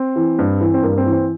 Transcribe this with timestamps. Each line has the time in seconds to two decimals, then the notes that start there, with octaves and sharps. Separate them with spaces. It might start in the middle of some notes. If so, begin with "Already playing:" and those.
Already playing: C4
0.16 E3
0.39 G2
0.61 E3
0.74 C4
0.83 G2 A#3
0.98 C4
1.06 E3
1.13 C4